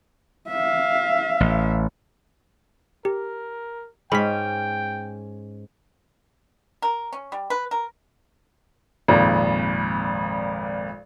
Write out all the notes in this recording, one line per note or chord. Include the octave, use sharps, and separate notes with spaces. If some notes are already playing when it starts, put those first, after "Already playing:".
E5 F5
A1
G4 A#4
G#2 C#4 G5 B5 B6
A#4
C#4
G3
B4
A#4
G#1 F2 A#2